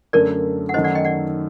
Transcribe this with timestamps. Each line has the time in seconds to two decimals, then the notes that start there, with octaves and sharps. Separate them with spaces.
0.13 F#2 D3 A3 A#4 D5
0.69 F#5
0.74 F#2 D#3 A3 C5 D#5
0.84 D5 F#5
0.95 D#5 G5
1.04 D5 F#5